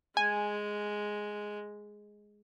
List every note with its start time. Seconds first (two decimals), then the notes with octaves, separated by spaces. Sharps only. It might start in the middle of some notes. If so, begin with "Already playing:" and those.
0.17 G#3 G#5